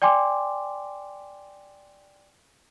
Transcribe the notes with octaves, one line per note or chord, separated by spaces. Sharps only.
D5 G5 G#5 C6 D6